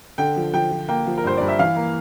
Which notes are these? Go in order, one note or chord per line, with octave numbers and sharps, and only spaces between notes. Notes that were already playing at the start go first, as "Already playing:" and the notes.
D3 G5
F3
F3 G5
F3
A#3 G5
F3
A#4
G2 C5
G2 D5
E5
E3 F5
A#3